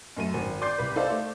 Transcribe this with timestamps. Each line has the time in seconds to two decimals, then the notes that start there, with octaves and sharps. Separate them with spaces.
0.17 F#2 A3 D#7
0.34 G#1
0.61 D5 C6 D6 G6 C7
0.78 C2 B4
0.96 D#4 A4 C5 D5 F5
1.10 A3